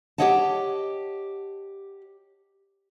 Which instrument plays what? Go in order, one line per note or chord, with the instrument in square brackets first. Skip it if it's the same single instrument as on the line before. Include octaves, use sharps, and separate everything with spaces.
[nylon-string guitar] G4 A4 C#5 D#5 F#5 A5